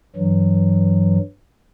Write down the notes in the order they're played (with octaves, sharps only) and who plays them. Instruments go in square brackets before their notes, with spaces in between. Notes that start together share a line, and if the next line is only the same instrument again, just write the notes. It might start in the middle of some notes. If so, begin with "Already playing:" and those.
[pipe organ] G2 E3 F#3